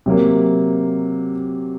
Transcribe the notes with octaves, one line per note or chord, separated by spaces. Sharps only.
C3 F#3 A#3